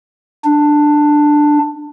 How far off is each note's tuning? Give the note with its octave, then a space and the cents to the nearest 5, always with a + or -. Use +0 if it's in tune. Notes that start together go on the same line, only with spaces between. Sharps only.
D4 +10